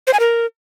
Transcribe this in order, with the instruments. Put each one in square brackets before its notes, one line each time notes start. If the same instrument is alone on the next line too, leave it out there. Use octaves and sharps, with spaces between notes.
[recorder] C5
G#5
A#4